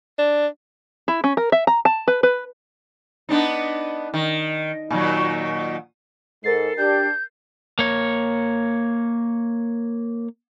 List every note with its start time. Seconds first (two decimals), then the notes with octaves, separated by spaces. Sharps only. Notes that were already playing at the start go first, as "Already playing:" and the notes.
0.18 D4
1.08 E4
1.24 C#4
1.37 A#4
1.52 E5
1.67 A#5
1.85 A5
2.08 B4
2.23 B4
3.29 B3 D4 D#4
4.14 D#3
4.90 A#2 D#3 F#3
6.44 G#2 A4 A#4 A6 C7
6.78 D4 G4 G6
7.79 A#3 C#5